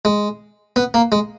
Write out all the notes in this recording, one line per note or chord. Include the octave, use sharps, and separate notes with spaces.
G#3
B3
A#3
G#3